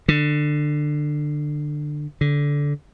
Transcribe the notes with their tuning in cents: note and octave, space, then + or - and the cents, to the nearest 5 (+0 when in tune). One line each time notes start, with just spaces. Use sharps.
D3 +20
D3 -20